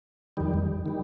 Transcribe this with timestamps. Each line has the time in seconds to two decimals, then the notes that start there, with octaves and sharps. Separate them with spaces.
0.37 F2 D#3 G3
0.86 D#3 G3